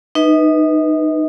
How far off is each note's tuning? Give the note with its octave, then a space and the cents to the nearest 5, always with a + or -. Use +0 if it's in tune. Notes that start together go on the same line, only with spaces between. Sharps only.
D#4 -20 B4 +0 D#5 +45